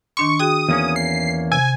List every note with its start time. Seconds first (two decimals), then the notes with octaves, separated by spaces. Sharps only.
0.17 D#3 D4 C6 C#6
0.39 F#4 G#4 G5 D#6
0.69 E2 A#3 C#4
0.96 C7
1.52 C3 G#5